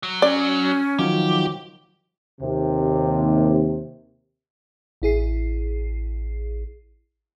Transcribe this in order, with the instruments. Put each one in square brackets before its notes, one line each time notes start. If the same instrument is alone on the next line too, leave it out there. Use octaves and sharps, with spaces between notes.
[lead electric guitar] F#3
[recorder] C#4 [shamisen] D5
[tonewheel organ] D#3 F3 F#3 [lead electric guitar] G4
[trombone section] D#2 C3
[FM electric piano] A1 E4 G#4 C7